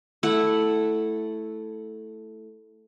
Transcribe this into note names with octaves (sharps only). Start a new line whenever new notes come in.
A3 E4 F#5